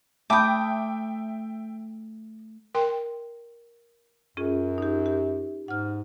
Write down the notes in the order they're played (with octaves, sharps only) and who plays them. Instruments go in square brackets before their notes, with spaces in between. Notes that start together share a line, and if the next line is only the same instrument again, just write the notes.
[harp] A3 [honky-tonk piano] E5 G5 [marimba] A5 B5 G6 [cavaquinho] D6 D#6
[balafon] A#4 G5 C6
[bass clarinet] F#2 [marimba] C#4 F4 G#4
[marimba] D#4 G4
G4
[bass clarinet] G#2 [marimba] F#5 F6